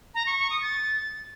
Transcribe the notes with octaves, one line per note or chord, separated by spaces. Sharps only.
A#5
C#6
C#6
D#6
A6